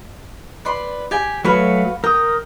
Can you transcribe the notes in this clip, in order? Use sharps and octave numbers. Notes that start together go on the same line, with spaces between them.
B4 D5 C6
G4 G5 G#5
F#3 A3 F#4 B4 C#5 F5
A#4 G5 D#6